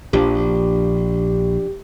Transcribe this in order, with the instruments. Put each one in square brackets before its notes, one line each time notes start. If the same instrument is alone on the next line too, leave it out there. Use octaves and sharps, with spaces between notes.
[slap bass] A#1 [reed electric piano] F3 D4 D5 [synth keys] G4